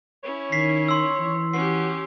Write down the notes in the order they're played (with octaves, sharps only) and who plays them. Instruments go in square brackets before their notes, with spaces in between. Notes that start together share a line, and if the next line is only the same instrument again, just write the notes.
[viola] C#4 E4 [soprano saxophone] C#5
[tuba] D#3 [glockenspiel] B6 C7
[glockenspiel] C6 E6
[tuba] E3
[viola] C#4 G4 [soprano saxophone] F#4 [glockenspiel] C7